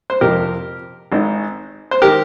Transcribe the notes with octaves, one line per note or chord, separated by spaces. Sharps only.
C5
F2 C3 F3 G4 A#4
G#1 G#2 D#3
C5
D#3 G4 A#4